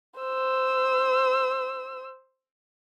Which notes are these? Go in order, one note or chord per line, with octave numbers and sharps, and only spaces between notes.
C5 E6